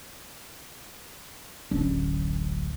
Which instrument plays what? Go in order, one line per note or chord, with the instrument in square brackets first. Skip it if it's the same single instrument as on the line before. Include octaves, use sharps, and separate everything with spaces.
[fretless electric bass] D1 C#4 D4 [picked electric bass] A1 D2 F#3